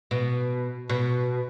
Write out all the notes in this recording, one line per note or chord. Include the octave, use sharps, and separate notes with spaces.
B2
B2